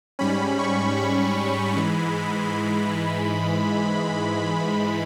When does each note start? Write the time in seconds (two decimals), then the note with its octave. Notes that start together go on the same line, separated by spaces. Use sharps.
0.19 G#2 G3 C#4 B5
0.59 C#6
0.97 B5
1.76 G#2 E3 G#3